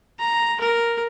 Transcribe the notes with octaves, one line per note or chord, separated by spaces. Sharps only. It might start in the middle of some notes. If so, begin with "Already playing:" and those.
A#5
A#4